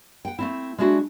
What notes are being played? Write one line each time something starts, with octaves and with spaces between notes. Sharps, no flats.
F#5 G5
A3 C4 E4
G#3 D4 E4 F#4